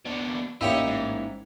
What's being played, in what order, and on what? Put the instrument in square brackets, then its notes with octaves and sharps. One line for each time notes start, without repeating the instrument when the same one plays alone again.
[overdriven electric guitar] B2 D4
[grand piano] A1 A#3 F5 [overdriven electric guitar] D#4 D#5 [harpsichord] E4 G4 C#5
[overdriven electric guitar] G#2